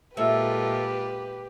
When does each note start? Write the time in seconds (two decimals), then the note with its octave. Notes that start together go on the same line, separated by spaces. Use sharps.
0.17 A#2 G#3 F4 G4 A4 B4 C#5 E5